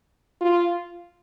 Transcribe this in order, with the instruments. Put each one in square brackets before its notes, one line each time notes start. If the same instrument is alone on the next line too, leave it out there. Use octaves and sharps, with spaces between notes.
[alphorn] F4